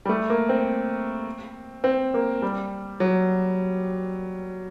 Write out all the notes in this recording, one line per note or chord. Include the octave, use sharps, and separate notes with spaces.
G3
A3
A#3
C4
C4
A#3
G3
F#3